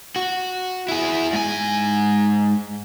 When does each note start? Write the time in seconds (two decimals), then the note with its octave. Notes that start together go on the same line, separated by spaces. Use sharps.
0.16 F#4
0.88 E4 G#4
1.33 G#2 G#5